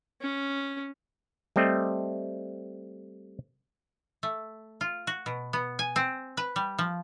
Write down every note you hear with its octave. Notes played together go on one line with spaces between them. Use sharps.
C#4
G3 A3 C4 D#5
A3
F4
F#4
B2
B3
G#5
C4
B4
G3
F3